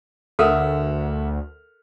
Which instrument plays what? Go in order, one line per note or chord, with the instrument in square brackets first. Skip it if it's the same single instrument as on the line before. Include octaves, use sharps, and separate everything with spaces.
[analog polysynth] D2 [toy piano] A4 A#4 [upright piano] E5 F#5 F6